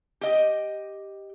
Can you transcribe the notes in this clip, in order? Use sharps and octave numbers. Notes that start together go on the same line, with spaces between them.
G4 D#5